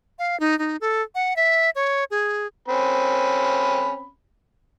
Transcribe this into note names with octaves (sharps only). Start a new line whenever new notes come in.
F5
D#4
D#4
A4
F#5
E5
C#5
G#4
C4 C#4 B5